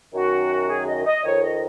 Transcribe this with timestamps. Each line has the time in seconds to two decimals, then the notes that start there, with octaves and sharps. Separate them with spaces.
0.14 F#2 D#3 F#4
0.69 G#4
0.87 D#5
1.05 D#5
1.24 F2 D#3 C#5
1.42 D#5